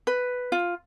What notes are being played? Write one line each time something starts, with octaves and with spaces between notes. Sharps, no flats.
B4
F4